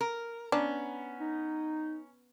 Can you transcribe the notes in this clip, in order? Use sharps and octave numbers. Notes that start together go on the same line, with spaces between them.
A#4
B3 C#4 D4 A#5
D#4